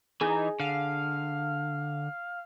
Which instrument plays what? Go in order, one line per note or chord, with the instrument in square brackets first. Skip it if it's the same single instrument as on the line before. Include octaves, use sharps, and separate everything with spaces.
[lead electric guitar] E3 [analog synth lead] D#4 [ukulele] G#4
[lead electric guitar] D3 [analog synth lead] F5